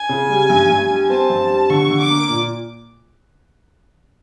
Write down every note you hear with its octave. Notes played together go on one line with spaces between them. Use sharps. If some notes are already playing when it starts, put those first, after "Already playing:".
Already playing: G#5
C#3
G3
G2
G2
G3
C4 A5
G2
G3
D3 C#6
D3
D6
A#3
A#2